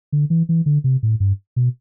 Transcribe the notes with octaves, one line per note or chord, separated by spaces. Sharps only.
D3
E3
E3
D3
C3
A2
G2
B2